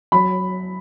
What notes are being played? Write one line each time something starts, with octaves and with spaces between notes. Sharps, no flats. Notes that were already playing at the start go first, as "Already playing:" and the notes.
F#3 B5